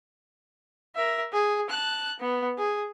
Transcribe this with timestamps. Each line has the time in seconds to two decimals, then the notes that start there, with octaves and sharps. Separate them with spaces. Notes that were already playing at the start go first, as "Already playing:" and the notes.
0.95 A#4 E5
1.32 G#4
1.69 A5 F#6
2.19 B3
2.58 G#4